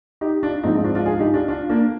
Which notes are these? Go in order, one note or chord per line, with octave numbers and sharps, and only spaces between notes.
D#4 G4
D4 F4
G#2 F3 C4 D#4
C4 D#4
D4 F4
D4 F4
F4 G#4
D#4 G4
D4 F4
D4 F4
A#3 D4